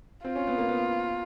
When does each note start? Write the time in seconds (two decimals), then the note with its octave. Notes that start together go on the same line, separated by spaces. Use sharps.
0.25 C4 F4
0.36 C#4
0.47 B3
0.58 A#3
0.69 B3